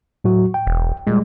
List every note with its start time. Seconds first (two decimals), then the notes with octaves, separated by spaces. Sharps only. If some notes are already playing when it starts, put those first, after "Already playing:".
0.24 A2 F#3 F#4
0.54 G5
0.67 E1
1.07 A#2 G3 G#3